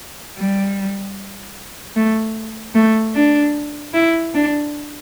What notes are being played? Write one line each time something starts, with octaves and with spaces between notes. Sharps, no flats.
G3
A3
A3
D4
E4
D4